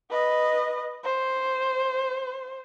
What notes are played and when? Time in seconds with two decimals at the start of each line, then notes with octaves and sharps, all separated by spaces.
0.10 B4 D#5
1.04 C5